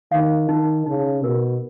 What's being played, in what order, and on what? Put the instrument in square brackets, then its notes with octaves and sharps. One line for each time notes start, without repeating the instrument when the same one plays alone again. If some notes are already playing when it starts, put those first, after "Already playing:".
[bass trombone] D#3 [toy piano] F5
[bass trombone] D#3 [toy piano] D#4
[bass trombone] C#3 [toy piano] D#4
[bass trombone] B2 [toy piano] A#4